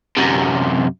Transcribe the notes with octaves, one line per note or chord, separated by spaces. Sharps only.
F#2 C3